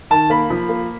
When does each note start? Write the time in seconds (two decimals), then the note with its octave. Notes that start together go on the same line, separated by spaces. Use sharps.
0.10 D#3 A5
0.30 A#3 B5
0.50 F3
0.69 A#3